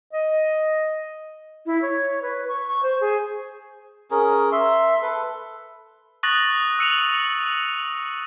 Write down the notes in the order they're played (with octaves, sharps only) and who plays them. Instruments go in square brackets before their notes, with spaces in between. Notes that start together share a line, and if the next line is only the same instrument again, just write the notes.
[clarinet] D#5
[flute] E4
C#5
B4
C#6
C#6
C5
G#4
[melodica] C#4 G#4 A#4
E5 C6
A4 B4
[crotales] C#6 D#6 F#6 A6 A#6 F#7
E6 C#7 D#7 F7